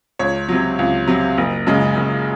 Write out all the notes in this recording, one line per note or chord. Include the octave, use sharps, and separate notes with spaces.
C#2 C#5
C3 F#3
C#2
C3 F#3
F#1
F#2 C#3 G#3
F#1